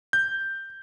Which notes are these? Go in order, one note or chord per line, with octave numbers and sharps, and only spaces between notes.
G6